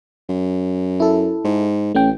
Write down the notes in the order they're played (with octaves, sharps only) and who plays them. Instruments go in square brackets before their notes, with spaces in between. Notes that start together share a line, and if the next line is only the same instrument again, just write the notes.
[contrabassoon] F#2
[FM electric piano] E4 A4
[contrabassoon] G#2
[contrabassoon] A1 [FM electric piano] A3 C#4 G5